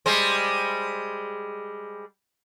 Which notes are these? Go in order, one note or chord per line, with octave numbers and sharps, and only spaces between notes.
G3 G#3 C5